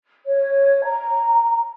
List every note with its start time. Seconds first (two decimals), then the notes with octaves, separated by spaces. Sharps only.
0.25 C#5
0.85 A#5